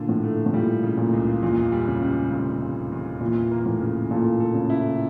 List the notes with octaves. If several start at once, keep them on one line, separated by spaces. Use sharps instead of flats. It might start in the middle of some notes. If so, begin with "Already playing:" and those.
Already playing: A#2 D3 D4
A2
A3
A2
A#2 G3
C#3
A#2
C#2
E2 A#2
G3
C#3
G3
F1
F1
E2
A#2 E3
A#3
A2
C#3
A#2 A4
A4
C#3
E4